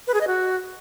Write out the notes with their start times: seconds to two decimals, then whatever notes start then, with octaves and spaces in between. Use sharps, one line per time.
0.07 B4
0.14 G#4
0.21 D#5
0.27 F#4